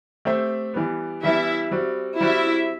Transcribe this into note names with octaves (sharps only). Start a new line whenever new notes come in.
A3 C4 G4 C5 E5
E3 G3 B3
E3 G3 B3 E4 E5
G3 C4 F#4
G3 C4 E4 F#4 E5